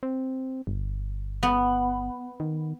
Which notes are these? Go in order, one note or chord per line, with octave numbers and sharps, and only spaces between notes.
C4
G1
B3
D#3